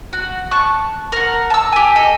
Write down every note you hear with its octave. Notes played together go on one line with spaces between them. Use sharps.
F#4
A5 C#6 F#6
A#4 F#5
A5 E6
G4 G#5
A4 D#5